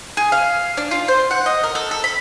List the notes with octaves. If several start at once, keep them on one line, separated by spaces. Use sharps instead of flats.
G#4
F5
D4
F4
C5
F#5
D#5
A#4
A4
A4
B5